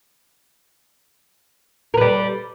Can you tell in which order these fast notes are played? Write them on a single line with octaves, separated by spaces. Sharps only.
A#4 B4 G3